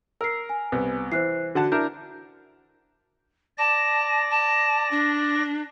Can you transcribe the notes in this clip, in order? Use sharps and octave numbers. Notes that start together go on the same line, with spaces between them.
A#4 E6 C7
G#5
C2 B3
E3 C5 F#6 C7
D3 F#4 F#5 A5
D4 E4 A#4 G6
D5 A5 A#6
A5
D4